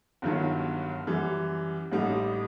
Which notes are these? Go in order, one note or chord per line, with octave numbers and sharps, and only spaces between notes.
G1 G2 D#3 F#3
F#2 E3 G3
A1 A2 G3 D#4